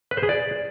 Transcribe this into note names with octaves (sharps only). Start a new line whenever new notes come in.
B4
C5
G#4
D5